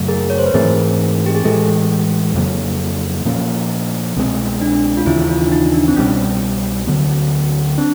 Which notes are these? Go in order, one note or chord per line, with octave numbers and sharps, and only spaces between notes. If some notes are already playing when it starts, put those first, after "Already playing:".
Already playing: F#2 C#3 F#3 A3
G#4 A#4
C#5
C5
B4
G#2 E3 A3 C4 G#4 A#4
G4
G#4
A2 E3 G#3 G4 A4
F2 C#3 F#3 A#3
A#2 F3 A#3 C#4
C2 B2 G#3 C4
D4
F4
D#2 C#3 E3 E4
E4
F4
D4
D#4
D4
C4
C2 B2 G3 C#4
D2 D3 F#3 B3
C4 D4